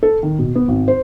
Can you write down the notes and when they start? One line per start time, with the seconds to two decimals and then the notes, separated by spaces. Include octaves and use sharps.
0.03 A4
0.23 D#3
0.39 B2
0.55 B3
0.68 G#1
0.88 C5